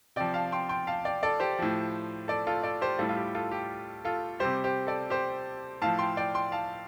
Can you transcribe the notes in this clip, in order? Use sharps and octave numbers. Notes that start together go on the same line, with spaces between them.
C3 F3 D5 G5
F5 A5
G5 C6
G5 C6
F5 A5
D5 G5
A4 D5
G4 C5
A2 F3
A4 D5
F4 A4
A4 D5
G4 C5
A2 G3 F4 A4
F4
G4
F4 A4
G4
F4 A4
C3 G3 G4 C5
G4 C5
A4 D5
G4 C5
A2 F3 F5 A5
G5 C6
D5 G5
G5 C6
F5 A5